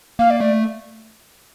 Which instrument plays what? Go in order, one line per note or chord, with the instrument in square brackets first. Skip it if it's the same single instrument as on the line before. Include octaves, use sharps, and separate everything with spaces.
[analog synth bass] A#3 [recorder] F5
[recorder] D5
[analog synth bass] A3 [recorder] D5